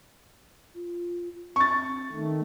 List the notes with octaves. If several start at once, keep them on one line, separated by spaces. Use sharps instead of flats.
F4
C4 C#6 A6
D#3 A3